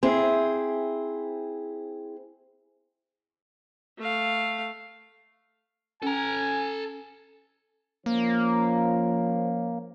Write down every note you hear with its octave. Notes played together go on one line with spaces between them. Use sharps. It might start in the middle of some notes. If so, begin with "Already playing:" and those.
C4 E4 G#4
A3 F5
C#4 A4 G#5 A#5
F3 A#3 C#4 C5